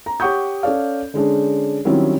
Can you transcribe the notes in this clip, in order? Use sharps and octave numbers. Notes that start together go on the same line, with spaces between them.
A#5
G4 C#5 F#5 C#6 D#6 G6
C#4 A4 C#5 D5 F5
D3 G#3 C#4 D4
D#3 F#3 G3 C4 C#4 E4